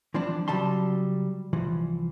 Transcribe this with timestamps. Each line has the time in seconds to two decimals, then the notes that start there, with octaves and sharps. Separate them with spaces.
0.14 E3 F3 G3 C4 D4
0.48 C#3 F#3 G3 A5 C6
1.53 C2 E3 F3